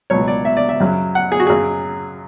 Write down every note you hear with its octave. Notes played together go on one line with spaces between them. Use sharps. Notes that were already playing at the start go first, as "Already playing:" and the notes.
C#2 B2 F#3 C#5
D5
E5
D5
E5
F#2 C#3 F#3
F#5
G#4
F#4
F#2 C#3 F#3 G#4